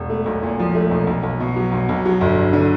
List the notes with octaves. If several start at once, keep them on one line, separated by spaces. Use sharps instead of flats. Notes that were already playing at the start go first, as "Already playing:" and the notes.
Already playing: E1
A3
B1
A#2
F3
A3
B1
B1
B1
B2
F#3
B1
B1
F#3
G1
G2
D3